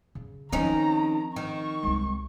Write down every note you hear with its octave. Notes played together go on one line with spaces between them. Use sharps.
C#3
D#3 F3 C4 C#4 D#4 A#5
D#3 C#6
C2 G#3